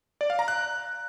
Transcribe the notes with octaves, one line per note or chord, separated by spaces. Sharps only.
D5
F5
A#5
F#6